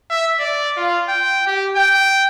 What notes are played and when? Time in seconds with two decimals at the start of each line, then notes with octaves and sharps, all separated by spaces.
0.10 E5
0.40 D5
0.77 F4
1.09 G5
1.47 G4
1.76 G5